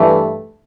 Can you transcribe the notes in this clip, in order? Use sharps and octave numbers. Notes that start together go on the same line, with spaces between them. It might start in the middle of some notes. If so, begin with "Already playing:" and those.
Already playing: G2 E3 A3